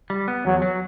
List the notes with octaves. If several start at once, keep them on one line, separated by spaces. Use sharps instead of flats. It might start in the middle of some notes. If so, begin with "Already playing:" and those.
G3
B3
E2 F#3
F#3